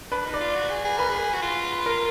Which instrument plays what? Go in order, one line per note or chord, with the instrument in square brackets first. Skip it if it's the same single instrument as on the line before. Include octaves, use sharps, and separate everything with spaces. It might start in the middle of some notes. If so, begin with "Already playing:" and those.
[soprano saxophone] D4 [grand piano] B4
[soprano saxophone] D#4
[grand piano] D5
[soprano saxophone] F4
F#4
G#4
G#4
[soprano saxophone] A#4 [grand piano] B4
[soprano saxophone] G#4
F#4
F4
[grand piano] A#4